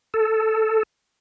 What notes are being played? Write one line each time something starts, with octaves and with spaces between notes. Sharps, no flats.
A4